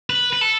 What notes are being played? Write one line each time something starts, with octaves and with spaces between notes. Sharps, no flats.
B4
B4
A4